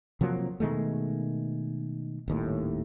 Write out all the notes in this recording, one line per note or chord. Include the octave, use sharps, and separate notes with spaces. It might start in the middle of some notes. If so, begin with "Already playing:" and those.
C3 F3 F#3 A#3
B2 D#3 G#3 A3
D#1 D#2 A2